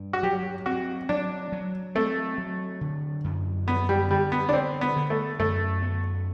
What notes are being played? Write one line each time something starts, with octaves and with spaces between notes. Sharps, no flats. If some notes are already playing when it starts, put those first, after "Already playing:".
Already playing: G2
F#4
F#3 G4
C4 F#4
F#3 D4
F#3
A3 C4
F#3
D3
F#2
D3 B3
G3
D3 G3
B3
D4
D3 C4
B3
D3
A3
F#2 A3
B3